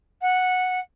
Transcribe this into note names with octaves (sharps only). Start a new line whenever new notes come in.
F#5